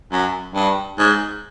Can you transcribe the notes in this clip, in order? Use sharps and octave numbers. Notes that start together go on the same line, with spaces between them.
F#2
G2
G#2